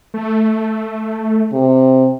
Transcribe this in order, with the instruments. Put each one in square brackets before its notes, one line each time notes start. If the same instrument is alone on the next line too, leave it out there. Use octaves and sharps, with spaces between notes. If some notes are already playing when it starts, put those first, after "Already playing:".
[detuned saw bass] A3
[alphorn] C3